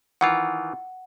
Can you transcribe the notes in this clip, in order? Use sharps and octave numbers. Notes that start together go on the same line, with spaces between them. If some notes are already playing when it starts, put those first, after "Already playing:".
D#3 E3 F4 F#5